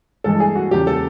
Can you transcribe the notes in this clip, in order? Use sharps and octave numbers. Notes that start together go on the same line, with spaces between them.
G2 E3 G#3 A4
G#4
F#4
E2 C#3 F3 G4
A4